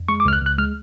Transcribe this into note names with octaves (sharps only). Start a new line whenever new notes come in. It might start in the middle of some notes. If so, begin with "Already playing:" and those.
Already playing: F2
G#3 C#6
D6
C#2 F6
F#6
C#2
F#6
G#3 F6